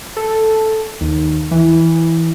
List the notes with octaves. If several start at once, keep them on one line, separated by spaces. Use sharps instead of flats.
A4
D#2
E3